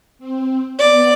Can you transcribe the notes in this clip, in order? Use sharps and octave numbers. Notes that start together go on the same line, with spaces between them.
C4
B3 D5